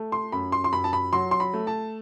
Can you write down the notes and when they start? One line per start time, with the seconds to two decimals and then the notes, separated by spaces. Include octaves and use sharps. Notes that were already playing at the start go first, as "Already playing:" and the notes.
Already playing: A3
0.12 C6
0.32 F#2 B5
0.52 C6
0.64 C6
0.73 F#2 B5
0.84 A5
0.93 B5
1.13 F#3 C6
1.31 C6
1.40 B5
1.53 A3
1.67 A5